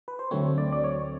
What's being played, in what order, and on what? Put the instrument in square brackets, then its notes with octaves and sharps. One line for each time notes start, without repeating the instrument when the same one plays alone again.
[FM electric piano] B4
C5
D2 D3 F#3 A3 C4 C#5
D5
D5
C#5